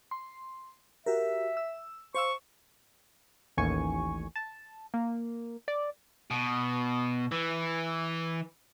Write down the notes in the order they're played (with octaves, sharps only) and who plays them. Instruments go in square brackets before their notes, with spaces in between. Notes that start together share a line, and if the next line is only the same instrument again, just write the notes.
[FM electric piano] C6
[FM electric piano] F#4 G4 A#4 [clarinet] E5
[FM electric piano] E6
[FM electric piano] C5 F5 E6 [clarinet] C#6
[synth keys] A1 D#2 G#5 C#6
A5
A#3
D5
[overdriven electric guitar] B2
E3